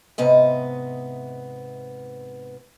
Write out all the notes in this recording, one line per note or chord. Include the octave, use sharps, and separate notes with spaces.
G#2 C3 B3 D#5